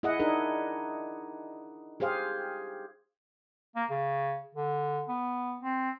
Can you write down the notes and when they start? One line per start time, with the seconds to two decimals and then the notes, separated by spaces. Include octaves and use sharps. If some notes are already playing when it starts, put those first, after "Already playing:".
0.03 E4 G#4 D#5 E5 F#5
0.20 D4 D#4 G#4 A#4
2.00 G4 G#4 C5 F5
3.76 A#3
3.90 C#3
4.55 D3
5.09 B3
5.61 C4